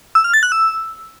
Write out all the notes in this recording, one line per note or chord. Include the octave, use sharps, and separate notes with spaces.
E6
F6
A6
F#6
E6